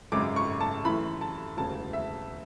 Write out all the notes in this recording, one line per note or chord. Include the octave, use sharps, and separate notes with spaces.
G#1 F#2 C#3 G#3 D6
C#6
A5
F#2 E3 A3 B5
A5
E1 D2 C#3 A5
E5